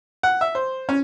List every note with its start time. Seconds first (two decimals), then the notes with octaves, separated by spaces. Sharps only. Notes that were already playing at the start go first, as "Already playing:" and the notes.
0.23 F#5
0.41 E5
0.55 C5
0.89 C#4